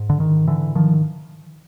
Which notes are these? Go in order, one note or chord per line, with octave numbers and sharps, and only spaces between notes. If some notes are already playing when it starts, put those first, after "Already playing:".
Already playing: G#2
D3
D#3
D3 E3
D#3 F3